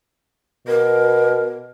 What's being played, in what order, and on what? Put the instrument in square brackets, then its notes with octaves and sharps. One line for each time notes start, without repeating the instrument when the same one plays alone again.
[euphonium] B2 [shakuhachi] A#4